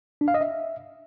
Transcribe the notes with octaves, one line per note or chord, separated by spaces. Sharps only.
D4
F5
D#5
E5